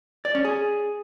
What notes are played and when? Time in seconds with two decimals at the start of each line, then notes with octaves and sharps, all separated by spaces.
0.25 D5
0.35 C#4
0.45 G#4